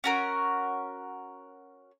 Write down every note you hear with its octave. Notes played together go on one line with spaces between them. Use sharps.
C#4 F#4 A#4